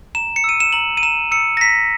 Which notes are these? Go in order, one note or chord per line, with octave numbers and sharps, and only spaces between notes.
A#5 E7
C#7
E6 D#7
E7
A#5 F#7
D#7
A#5 E7
E6 C#7
A#6
A#5 B6